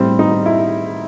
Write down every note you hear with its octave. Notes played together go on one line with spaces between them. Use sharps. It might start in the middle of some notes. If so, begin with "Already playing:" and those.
Already playing: A2 G3 C4
D#4
E4